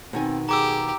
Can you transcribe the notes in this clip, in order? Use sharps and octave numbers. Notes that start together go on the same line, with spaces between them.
B2 D#3 C4 G#5
G4 G#4 A#5 D6 E6